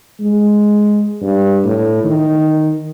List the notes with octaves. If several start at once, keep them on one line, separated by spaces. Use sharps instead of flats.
G#3
G2
A2
D#3